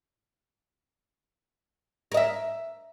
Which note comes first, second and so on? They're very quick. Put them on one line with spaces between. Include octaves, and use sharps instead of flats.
A#4 D#5 E5